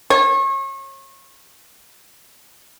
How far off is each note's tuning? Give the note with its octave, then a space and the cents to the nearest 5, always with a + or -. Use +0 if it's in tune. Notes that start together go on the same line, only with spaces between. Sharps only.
C#5 -35